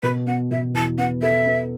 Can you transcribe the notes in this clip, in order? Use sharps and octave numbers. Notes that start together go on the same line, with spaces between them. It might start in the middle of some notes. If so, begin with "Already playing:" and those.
B2 B4
B3 F#5
B2 E5
E2 A5
B3 F#5
A4 E5
B3